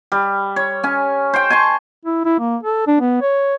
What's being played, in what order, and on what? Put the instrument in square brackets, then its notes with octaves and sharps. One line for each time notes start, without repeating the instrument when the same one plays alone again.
[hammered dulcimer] G3
C#5
C#4 G#5
C5 G5
G#5 A5 C6 C#6
[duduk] E4
E4
A#3
A4
D4
B3
C#5